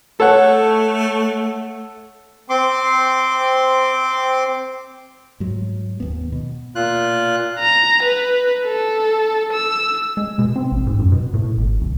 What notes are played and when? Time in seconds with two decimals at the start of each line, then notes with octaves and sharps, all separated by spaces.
0.20 A3 A4 C#5 F#5
2.50 C4 C6 D6
5.40 G#2 F#3
6.00 D#2 B3
6.32 B2
6.76 A#2 F4 F#6
7.60 A#5
8.03 B4
8.66 A4
9.53 E6
10.17 G#3
10.39 B2
10.56 C4
10.72 A1
10.87 G#2
10.99 F#2
11.12 B2
11.34 A2
11.58 G#1
11.81 C2